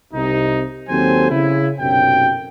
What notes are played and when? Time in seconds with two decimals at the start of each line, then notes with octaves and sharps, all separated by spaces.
0.13 C2 C3 D#4
0.89 D#2 F#3 C4 A4 C5 G#5
1.31 C#3 E4
1.80 B1 F#2 C3 G5